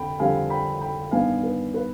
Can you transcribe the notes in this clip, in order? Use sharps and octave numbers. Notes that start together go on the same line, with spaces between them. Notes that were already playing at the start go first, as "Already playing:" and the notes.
Already playing: F2 D3 G5 B5
F2 D3 G3 C4 F5 G#5
G5 B5
G5 B5
G2 D#3 B3 D4 F5 G#5
B4
B4